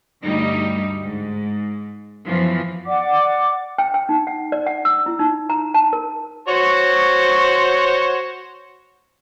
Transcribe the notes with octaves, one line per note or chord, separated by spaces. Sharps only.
D2 G2 G3 D#4
G#2
F#2 E3 F3 B3
D5 F#5 D6
G5
G5
D#4
F#5
D5
F#5
E6
E4
D#4
A#5
A5
A#4
F#4 C5 C#5